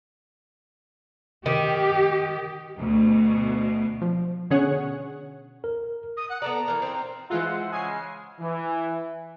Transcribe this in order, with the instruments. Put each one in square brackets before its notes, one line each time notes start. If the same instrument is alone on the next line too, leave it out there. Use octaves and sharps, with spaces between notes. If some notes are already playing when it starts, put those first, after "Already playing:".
[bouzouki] D#3 [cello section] G4
[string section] D2 B2
[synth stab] F3
B2 D3 C#4 G#4 C#5 F#5
[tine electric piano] A#4
[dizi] D#6
F#5
[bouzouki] B3 A4 D5 [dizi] A#5
[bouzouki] E3 A#3
C4 D#4
[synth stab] E3 G#3 F4 [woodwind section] C5 E5 F#5
[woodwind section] C#3 G#3 [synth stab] G#5 C7
[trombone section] E3